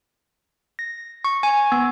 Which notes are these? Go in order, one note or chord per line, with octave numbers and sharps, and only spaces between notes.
A#6
C#6
G#5
B3